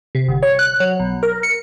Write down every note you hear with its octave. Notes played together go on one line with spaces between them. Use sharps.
C3
G1
C#5
F#6
F#3
B1
A#4
C#7